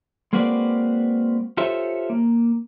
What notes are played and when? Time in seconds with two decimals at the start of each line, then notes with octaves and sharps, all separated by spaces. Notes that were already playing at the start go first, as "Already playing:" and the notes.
0.33 G#3 A#3 C4 F#4 B4 D5
1.57 F4 G4 A4 C5 C#5 E5
2.10 A#3